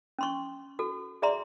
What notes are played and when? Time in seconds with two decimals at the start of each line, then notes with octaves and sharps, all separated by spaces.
0.19 C#4 C6 C#6
0.79 F#4 A4
1.22 G#4 D5 E5 A#5 C6